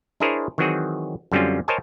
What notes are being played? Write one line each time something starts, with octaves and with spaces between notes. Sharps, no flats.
D4 E4 G#4 A#4 C5 C#5
D#3 E3 F#3 C4 F#4 G#4
F#2 D3 G3 C4 C#4 F4
A#4 C5 C#5 D#5 G#5 A5